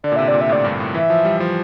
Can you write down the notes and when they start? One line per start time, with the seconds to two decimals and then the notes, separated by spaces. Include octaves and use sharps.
0.03 D3 D5
0.12 A#2
0.16 C3 E5
0.28 D5
0.34 A#2
0.41 E5
0.49 A2 D5
0.64 G2
0.80 A2
0.94 E3 E5
1.10 F3
1.25 G3
1.40 F3